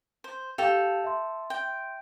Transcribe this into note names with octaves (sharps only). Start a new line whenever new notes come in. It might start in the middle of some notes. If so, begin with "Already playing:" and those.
C5
G4 A4 F5 G5 F7
E5 C6
G5